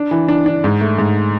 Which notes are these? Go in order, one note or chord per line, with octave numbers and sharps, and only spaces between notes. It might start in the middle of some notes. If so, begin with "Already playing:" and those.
Already playing: D4
E3
D4
D4
G#2
A3
G#2